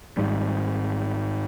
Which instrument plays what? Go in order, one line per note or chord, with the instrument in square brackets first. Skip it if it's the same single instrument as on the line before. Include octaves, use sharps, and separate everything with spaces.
[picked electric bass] G#1 C#2 G#2 G3